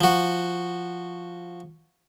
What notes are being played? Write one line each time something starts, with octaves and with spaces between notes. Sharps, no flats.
F3 F#4